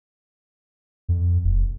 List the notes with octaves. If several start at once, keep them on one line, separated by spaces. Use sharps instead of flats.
F2
E1